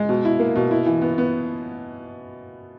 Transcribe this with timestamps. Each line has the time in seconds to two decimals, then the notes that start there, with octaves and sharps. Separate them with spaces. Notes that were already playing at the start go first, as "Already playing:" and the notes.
Already playing: G#3
0.09 B2
0.25 E4
0.40 A#3
0.55 B2
0.71 E4
0.86 E3
1.02 B3
1.18 B3